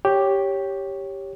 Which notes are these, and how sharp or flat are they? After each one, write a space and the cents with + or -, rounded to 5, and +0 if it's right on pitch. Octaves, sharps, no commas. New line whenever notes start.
G4 +0 C#5 +0